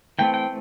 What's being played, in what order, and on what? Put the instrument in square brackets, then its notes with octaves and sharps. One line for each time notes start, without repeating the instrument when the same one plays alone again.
[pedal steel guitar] E3 A3 C4 G5
G5